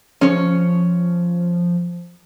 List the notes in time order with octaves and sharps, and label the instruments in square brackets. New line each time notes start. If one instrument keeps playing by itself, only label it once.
[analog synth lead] F3 [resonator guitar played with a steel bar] C#4 C#5